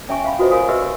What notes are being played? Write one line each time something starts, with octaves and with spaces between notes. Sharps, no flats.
C#4 C#5 E5 G#5 A5 C#6
E5 F5 B5
F4 F#4 A4 B4 C5 D#5
A#4 C#5 F5 G#5 D#6
F#4 G4 B4 D#5 E5 E6
C#5